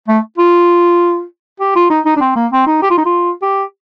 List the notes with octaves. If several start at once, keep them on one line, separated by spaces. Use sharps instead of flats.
A3
F4
G4
F4
D#4
D#4
D4
C4
A#3
C4
D#4
G4
F4
D#4
F4
G4